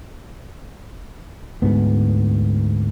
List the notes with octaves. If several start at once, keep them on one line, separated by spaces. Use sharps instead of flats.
D2 G#2 B3